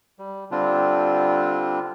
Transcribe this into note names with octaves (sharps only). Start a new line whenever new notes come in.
G3
D3 G3 C4 D4 F4